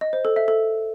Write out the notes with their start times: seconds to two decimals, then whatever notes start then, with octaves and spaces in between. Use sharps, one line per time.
0.01 D#5
0.13 C5
0.25 A4
0.36 E5
0.48 A4